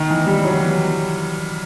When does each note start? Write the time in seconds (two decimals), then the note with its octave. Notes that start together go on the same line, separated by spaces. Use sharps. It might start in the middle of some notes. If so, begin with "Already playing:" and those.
Already playing: D#3
0.10 E3
0.27 G3
0.44 F#3
0.60 E3